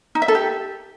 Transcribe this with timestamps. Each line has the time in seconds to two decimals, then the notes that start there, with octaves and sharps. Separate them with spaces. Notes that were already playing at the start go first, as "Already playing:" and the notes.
0.15 D#4
0.22 E5
0.28 A4
0.35 G4